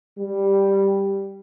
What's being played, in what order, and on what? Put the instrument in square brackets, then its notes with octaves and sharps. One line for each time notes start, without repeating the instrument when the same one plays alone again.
[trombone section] G3